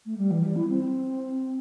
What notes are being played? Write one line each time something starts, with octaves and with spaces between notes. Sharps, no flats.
A3
G3
E3
G3
E4
C4